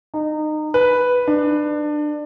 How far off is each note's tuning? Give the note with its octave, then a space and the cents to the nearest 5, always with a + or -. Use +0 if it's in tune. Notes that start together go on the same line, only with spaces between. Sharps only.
D#4 -25
B4 +0
D4 +25